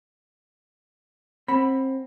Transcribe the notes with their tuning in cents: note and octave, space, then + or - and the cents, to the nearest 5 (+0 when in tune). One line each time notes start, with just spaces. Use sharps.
C4 +25 F#5 +15 B5 +0